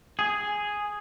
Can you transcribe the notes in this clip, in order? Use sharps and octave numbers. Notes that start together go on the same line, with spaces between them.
G#4